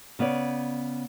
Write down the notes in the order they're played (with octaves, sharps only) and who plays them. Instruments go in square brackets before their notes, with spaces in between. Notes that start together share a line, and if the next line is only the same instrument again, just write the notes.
[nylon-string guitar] C#3 B3 C#5 D5